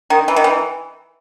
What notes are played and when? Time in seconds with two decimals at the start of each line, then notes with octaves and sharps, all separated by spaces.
0.10 D#3
0.28 E3
0.36 D#3
0.44 E3